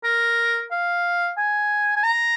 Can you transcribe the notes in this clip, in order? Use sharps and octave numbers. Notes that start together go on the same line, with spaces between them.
A#4
F5
G#5
G#5
A#5